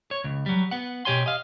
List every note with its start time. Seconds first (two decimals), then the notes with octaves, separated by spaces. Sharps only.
0.11 C#5
0.24 C#2
0.46 F#3 G3
0.71 B3 F#5
1.05 B2 G4 C#5 G#5 C6
1.26 D#5 F5